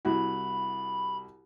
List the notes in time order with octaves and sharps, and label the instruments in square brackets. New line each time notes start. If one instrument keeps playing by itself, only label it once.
[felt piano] C2 E4 F#4 [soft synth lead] B5